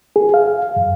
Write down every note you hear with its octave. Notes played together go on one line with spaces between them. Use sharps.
G#4
F5
F#2